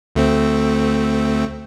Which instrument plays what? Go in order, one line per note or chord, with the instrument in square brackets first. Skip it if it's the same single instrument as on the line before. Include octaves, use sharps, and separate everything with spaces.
[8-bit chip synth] D2 A3 C4